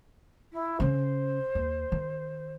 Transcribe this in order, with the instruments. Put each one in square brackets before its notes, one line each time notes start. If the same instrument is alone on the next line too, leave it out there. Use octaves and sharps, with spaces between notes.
[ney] E4
[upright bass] C#3 C#4 [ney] C5
[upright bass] D#2
D#3